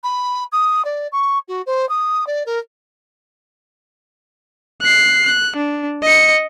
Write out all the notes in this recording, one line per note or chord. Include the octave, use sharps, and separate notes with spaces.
B5
D#6
D5
C#6
F#4
C5
D#6
D5
A#4
F#6 C7
F#6
D4
D#5 C#7